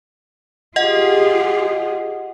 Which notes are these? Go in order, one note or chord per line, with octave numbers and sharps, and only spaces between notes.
F4 G4 G#4 D#5 F#5